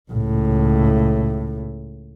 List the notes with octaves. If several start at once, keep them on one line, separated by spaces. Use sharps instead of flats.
C#2 A2